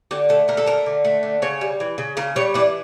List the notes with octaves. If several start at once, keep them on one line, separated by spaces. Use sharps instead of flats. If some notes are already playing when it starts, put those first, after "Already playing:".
D3 G4
A3 A4
D3 A#4
A4
A3 A#4
D3
A3
D3
C#3 C#5
G3
E3
C#3
C#3 A#4
G3 C#5
E3 D4